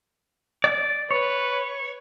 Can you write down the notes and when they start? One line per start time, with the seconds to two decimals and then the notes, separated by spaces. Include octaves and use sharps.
0.64 D5
1.11 B4 C#5